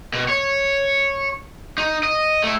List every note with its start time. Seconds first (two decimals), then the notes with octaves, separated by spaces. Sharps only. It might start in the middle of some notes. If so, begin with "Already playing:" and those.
0.13 B2
0.29 C#5
1.78 D#4
2.03 D#5
2.44 A3 E4